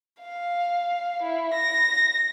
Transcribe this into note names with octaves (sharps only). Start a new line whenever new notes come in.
F5
E4
A#6